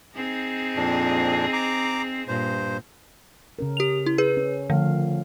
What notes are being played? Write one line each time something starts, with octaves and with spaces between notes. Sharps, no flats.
C4 D#4 G#4
F2 A#2 D4
A#5 D6
G2 A#2 C5
C#3 C#4 A#4
G4 F7
E4
G#4 B4
C#4
D3 F3 A3 F5